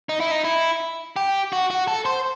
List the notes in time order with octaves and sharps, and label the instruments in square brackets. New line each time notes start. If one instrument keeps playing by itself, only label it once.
[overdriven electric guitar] D#4
E4
D#4
E4
G4
F#4
F#4
A4
C5